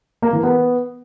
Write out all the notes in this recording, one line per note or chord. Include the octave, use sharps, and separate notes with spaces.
A#3
E3
B3